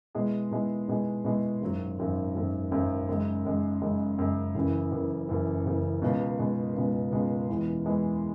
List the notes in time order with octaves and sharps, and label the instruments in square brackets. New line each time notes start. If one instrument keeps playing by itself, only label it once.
[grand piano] B2 G#3 E4 G#4
B2 G#3 E4 G#4
B2 G#3 E4 G#4
B2 G#3 E4 G#4
G#1 F#2 F#3
G#1 F#2 F#3
G#1 F#2 F#3
G#1 F#2 F#3
F#2 C#3 G#3
F#2 C#3 G#3
F#2 C#3 G#3
F#2 C#3 G#3
F#1 F#2 C#3 E3
F#1 F#2 C#3 E3
F#1 F#2 C#3 E3
F#1 F#2 C#3 E3
C#2 B2 G#3
C#2 B2 G#3
C#2 B2 G#3
C#2 B2 G#3
E2 E3 G#3
E2 E3 G#3